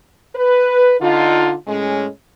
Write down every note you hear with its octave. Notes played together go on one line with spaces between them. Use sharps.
B4
D3 D#4 F4
A2 G#3 C#4